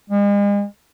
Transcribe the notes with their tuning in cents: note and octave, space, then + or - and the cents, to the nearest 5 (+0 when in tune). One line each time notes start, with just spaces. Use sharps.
G#3 -40